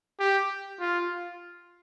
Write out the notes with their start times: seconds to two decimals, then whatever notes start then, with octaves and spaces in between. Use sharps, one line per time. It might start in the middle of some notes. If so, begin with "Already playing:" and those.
0.20 G4
0.80 F4